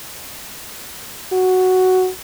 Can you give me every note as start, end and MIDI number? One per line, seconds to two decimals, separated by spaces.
1.32 2.09 66